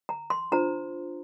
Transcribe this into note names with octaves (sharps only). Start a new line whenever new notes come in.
A#5
C6
D4 F4 C5 A#5